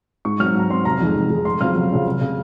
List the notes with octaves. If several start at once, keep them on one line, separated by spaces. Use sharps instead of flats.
G#2 C#6
F#3 C4 F6
G#2 A#5
F#3 C4 C6
F1 A#5
F2 D#3 G#3
F1
F2 D#3 G#3
F2 C6
C#3 F#3 C4 F4 F6
F2
C#3 F#3 C4 F4
F1
C#3